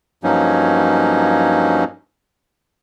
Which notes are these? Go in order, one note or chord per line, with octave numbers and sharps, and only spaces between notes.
G2 F3 F#3 A#3 C#4 D#4